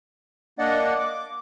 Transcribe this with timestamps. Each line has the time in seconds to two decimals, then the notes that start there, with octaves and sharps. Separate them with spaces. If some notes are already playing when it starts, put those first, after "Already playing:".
0.59 A#3 D4 D5 D#5 F#5
0.98 D6